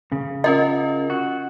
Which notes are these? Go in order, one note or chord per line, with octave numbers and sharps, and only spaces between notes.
C#3
C#4 F4 A#4 D#5
F#4